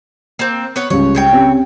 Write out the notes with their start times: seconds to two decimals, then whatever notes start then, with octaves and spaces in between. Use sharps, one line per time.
0.39 A#3 C4
0.76 B3 B4 C#5
0.90 C#2 G3 C#5
1.15 C#3 C#5 G5
1.32 C4 C#4 G4